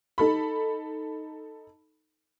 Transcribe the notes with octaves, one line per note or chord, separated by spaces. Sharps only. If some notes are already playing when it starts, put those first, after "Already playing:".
D#4 A4 B5